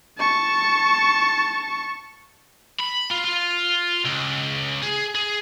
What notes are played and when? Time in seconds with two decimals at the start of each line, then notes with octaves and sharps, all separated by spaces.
0.18 A5 C#6
2.80 B5
3.11 F4
3.24 F4
4.05 C#2
4.83 G#4
5.15 G#4